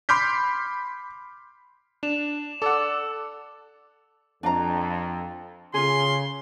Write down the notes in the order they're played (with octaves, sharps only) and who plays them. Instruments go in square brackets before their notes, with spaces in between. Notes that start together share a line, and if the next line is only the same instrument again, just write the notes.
[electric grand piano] B5 C6 D6 F6 G6 B6
[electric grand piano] D4 [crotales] E7 F7
[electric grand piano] A4 F#5 [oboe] D5 [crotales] D6 E6
[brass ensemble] F2 [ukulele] D4 F5 A#5
[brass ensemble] C#3 [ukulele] F4 G#4 [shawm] C6